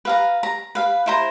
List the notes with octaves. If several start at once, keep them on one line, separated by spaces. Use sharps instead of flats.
B4 F5 A#5
A#5
B4 F5
E4 C5 A#5